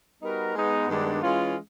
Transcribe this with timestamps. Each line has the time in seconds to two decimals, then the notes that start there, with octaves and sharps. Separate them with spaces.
0.21 G3 B3 D#4 F#4 A#4
0.55 G#3 B3 D#4
0.88 G2 D#3 G#3 B3 D4
1.23 E3 G#3 C#4 F4